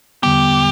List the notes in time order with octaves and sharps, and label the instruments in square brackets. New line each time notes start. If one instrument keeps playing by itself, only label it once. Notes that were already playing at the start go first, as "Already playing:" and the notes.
[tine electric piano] E2 D3 G3 B3 [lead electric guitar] G4